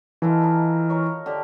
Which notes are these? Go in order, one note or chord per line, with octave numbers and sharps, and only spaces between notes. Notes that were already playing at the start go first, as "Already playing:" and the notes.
D#3 E3 F4 A4
D#4 A#4
A#4 C#5
D3 G4